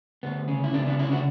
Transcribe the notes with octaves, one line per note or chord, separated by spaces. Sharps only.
D2 B3
C#3 C#4
E4
C#3 B3 D4
B3 D4
D2 C#4 E4
D4 F#4